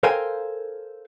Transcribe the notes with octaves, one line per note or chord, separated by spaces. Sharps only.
A4 A#4 C5 F5 G5 G#5